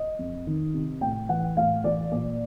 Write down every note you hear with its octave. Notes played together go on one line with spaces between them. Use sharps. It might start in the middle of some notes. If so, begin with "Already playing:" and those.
Already playing: D#5
F2
D#3
C3
A2 G5
E3 F#5
A2 F5
E3 D5
A#2 D5